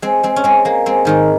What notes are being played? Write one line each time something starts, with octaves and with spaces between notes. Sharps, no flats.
G#3 C4
G#3 C4
C#4
G#3 C4
G#3 A#3
G#3 C4
G#2 D#3 D#4